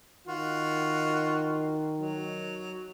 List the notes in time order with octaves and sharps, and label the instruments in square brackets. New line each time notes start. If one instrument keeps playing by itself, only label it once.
[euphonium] D#3 [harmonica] F4 F#4
[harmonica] F#3